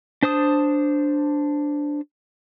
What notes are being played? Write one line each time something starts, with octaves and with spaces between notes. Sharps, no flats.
D4 C5 A5 D#6